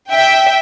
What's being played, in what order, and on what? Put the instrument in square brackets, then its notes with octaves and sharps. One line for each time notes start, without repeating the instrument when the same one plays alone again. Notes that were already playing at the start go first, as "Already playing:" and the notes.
[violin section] E5 G5